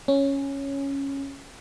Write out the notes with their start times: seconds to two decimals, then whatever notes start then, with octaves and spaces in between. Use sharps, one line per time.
0.08 C#4